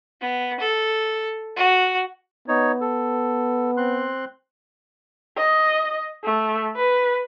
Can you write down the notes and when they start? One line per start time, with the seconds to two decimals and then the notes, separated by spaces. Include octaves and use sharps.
0.21 B3
0.60 A4
1.56 F#4
2.48 B3 D#4 C#5
2.81 A4
3.77 C4 C6 F#6
5.37 D#5
6.24 A3
6.76 B4